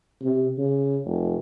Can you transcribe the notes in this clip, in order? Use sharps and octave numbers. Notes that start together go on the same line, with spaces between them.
C3
C#3
F1